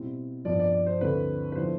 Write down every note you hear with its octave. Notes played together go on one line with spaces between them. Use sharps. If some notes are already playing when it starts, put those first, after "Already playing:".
Already playing: B2 G3 C4 E4
G2 F3 B3 D5
D5
D5
C5
D2 D3 A3 C4 E4 B4
B4
D3 F3 B3 E4 C5